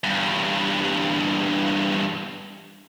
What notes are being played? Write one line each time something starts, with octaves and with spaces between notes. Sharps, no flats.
E2 G2